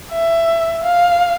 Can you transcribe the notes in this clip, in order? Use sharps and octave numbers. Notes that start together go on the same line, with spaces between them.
E5
F5